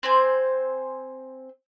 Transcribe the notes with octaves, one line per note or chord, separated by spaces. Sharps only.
C4 C5 G#5